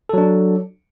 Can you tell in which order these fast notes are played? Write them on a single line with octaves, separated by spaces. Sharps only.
A4 F#3 D4